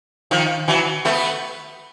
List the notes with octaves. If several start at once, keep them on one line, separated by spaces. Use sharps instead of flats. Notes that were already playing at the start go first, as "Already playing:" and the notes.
D#3 F3
E3 F#3
A3 B3